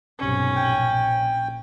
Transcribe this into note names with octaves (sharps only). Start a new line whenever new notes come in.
B1 G2 C3 C#4
A#1 G5